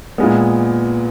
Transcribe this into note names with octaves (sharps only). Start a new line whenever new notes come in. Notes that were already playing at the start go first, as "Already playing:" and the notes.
A#2 G#3 B3